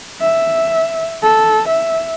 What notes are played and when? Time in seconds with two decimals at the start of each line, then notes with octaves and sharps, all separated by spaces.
0.21 E5
1.23 A4
1.68 E5